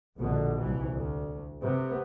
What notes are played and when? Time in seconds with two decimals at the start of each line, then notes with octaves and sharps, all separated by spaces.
0.17 A#1 B2 D3
0.58 C2 E3
0.95 D2
1.62 C3 B3